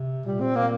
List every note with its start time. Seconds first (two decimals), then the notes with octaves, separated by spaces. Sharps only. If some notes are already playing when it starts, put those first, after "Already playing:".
Already playing: C3
0.26 A#2 G3
0.40 C4
0.56 A#3